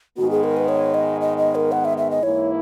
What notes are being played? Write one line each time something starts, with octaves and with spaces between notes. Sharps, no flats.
G#2 D#3 G#3 B3 F#4
G#4
A#4
B4
C#5
D#5
D#5
D#5
A#4
F#5
E5
E5
D#5
G#2 E3 A#3 E4 C#5